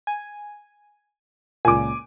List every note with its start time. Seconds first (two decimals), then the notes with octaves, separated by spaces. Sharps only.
0.07 G#5
1.65 C#2 A#2 G#5 D6